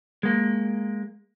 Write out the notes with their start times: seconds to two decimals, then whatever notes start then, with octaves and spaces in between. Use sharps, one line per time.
0.23 G#3 A#3